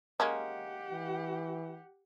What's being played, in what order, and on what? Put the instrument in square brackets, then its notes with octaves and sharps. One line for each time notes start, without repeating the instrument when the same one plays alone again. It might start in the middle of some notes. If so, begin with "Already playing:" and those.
[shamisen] G#3 A#3 C#4 [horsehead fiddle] G4 F#5
[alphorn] E3